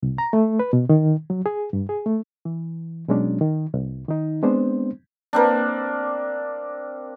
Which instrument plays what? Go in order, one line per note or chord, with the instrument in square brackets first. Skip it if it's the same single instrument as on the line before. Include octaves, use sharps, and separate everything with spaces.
[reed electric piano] C2
A#5
A3
B4
B2
D#3
F#3
G#4
G2
G#4
A3
E3
B2 F#3 G#3 C#4 D4
D#3
C2
D#3 D#4
G#3 B3 C4 D4 C5
[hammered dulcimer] A#3 C4 D4